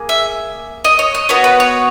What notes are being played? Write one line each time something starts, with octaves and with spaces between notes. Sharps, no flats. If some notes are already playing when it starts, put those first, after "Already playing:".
Already playing: A#3 G#4
E5
D#5
C#5
D#5
B3 F#4 C#5
B4
C#5